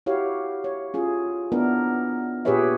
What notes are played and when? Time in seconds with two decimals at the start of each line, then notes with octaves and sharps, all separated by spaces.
0.06 E4 F#4 G4 C#5 F5
0.64 C#5
0.94 C#4 F4 G#4
1.52 B3 D4 E4 A#4
2.45 A#2 G4 G#4 B4 C#5 E5